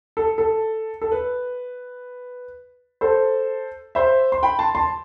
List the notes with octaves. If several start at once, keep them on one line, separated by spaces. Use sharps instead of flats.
A4
A4
A4
B4
A4 C5
C5 E5
C6
G5 B5
A5 C6
A5 C6